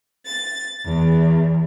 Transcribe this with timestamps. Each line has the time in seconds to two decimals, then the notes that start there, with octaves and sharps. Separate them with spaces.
0.25 A6
0.84 E2